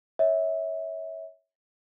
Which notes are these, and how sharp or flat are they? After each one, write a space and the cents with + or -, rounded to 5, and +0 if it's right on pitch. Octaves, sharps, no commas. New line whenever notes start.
C#5 +0 E5 -25